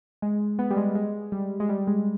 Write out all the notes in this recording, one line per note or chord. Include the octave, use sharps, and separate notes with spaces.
G#3
B3
G3
G#3
G#3
G3
G#3
G3
G#3